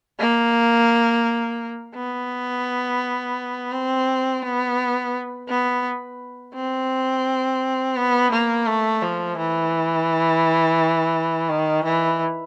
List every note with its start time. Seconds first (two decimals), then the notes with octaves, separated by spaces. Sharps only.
0.20 A#3
1.96 B3
3.72 C4
4.43 B3
5.48 B3
6.55 C4
7.96 B3
8.32 A#3
8.66 A3
9.02 F3
9.38 E3
11.49 D#3
11.85 E3